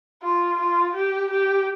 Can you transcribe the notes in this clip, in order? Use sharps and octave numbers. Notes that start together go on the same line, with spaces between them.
F4
F4
G4
G4